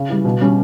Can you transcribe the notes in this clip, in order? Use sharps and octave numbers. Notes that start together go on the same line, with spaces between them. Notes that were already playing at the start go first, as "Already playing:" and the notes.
Already playing: C#3
E3 G3
B2
G3 C#4